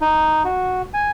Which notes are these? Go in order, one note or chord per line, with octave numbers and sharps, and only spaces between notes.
D#4
F#4
G#5